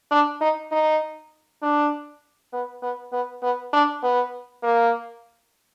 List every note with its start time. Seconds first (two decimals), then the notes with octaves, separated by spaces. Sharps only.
0.11 D4
0.41 D#4
0.71 D#4
1.62 D4
2.53 B3
2.82 B3
3.12 B3
3.43 B3
3.73 D4
4.03 B3
4.63 A#3